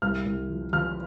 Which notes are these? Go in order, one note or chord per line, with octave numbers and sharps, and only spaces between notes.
C2 F6
C2
F3
F3 F6